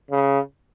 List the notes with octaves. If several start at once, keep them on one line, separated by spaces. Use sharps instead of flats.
C#3